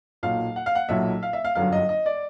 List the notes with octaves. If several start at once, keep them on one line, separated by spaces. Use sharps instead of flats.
B1 A#2 F#3 F5
F#5
F5
F#5
B1 A#2 F#3 E5
F5
E5
F5
G1 F#2 D3 F#3 F5
D#5
D#5
D5